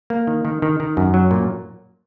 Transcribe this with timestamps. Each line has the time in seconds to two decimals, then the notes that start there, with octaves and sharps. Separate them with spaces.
0.10 A#3
0.27 D#3
0.45 D#3
0.62 D#3
0.80 D#3
0.97 F#2
1.14 F#3
1.31 A#2